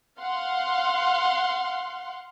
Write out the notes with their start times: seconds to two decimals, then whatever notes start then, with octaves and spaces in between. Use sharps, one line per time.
0.20 F5 F#5 C6